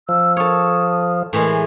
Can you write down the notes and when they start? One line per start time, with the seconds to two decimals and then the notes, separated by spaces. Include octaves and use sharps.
0.09 F3 E6
0.37 A4 C#5 D#6
1.33 A2 E3 G#3